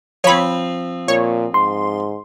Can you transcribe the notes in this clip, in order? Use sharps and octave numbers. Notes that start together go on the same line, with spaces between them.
F3 C4 C#5 B5
A#2 C#5
G#2 C6